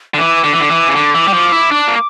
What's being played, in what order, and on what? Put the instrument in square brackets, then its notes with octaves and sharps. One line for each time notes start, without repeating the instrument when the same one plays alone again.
[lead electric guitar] D3
[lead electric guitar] E3 [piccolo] D6
[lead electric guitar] D3
E3
D3
E3
C#3
D3
E3
G3
F3
E4
D4
A#3